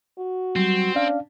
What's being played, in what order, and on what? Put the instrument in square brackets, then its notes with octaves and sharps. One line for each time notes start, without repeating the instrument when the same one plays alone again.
[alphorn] F#4
[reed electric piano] F#3 G3 [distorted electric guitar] C4
[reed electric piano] C#4 F5 [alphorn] D4